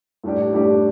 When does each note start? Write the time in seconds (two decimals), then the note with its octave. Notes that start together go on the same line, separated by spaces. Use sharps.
0.24 A2 G3 D4 G4
0.53 A2 G3 D4 G4